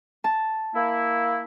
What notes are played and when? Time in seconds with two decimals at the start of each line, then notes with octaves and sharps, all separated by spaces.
0.24 A5
0.75 A#3 E4